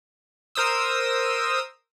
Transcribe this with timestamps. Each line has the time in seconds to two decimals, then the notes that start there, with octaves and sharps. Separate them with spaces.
0.55 A#4 C5 D#6 E6